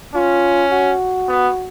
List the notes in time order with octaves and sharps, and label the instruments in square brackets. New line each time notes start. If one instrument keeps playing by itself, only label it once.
[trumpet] C#4 [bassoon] F4
[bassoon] F#4
[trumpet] B3